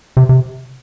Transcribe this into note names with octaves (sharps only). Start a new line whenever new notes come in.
C3
C3